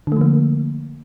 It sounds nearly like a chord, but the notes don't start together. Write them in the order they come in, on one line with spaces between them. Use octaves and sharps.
D3 A3 F3 A#3